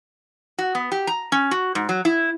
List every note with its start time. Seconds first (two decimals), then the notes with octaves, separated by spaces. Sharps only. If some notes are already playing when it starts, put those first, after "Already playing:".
0.58 F#4
0.75 B3
0.92 G4
1.07 A#5
1.32 C#4
1.51 F#4
1.75 G#2
1.89 F#3
2.05 E4